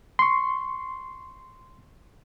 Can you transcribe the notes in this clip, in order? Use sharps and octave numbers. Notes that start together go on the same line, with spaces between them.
C6 C#6